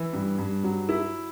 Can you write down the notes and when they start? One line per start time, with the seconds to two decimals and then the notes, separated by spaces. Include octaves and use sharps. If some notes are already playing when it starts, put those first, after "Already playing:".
Already playing: E3
0.13 G2
0.38 G2
0.64 F#3
0.89 E4